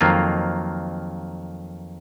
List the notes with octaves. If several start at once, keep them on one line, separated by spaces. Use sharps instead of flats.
F2 D#3 F#3 A#3 F4